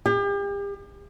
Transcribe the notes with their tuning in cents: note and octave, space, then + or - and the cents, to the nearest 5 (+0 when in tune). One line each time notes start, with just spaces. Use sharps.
G4 +40